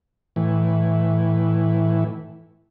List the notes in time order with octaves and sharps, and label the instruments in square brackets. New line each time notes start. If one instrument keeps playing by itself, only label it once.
[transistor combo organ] A2 E3